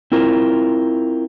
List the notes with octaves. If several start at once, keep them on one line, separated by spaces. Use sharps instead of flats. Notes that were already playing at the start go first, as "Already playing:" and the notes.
C4 E4 F4 A#4